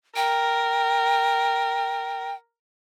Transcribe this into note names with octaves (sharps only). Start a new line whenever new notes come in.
A#4 G5